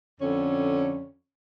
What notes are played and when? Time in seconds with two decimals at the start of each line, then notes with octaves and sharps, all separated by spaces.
0.20 F2 D3 C#4